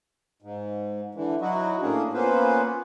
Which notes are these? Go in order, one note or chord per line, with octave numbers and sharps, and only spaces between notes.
G#2
D3 E3
F#3 D#4 E4 F#4
A2 A#3 C#4 D4 G#4
A#3 B3 C#4 F4 B4 C5